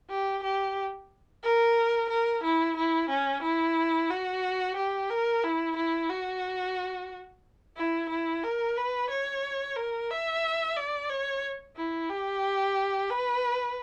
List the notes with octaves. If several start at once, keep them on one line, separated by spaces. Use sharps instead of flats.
G4
G4
A#4
A#4
E4
E4
C#4
E4
F#4
G4
A#4
E4
E4
F#4
E4
E4
A#4
B4
C#5
A#4
E5
D5
C#5
E4
G4
B4